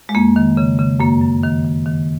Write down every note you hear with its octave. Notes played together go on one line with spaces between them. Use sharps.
G#3
F2 A#3
D#3
C#3
C#3
F#2 A#3
F#2
D#3
D#3
D#3